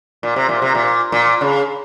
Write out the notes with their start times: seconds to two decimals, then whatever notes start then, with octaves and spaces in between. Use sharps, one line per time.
0.23 A#2
0.36 C3
0.49 A#2
0.62 C3
0.75 A#2
1.12 A#2
1.41 C#3